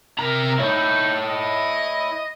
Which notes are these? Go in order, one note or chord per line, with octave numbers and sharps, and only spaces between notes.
C3 A#4 A#5
D#4 E4 C#5
D#5